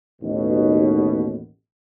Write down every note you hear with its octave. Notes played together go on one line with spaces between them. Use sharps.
A1 D#2 B2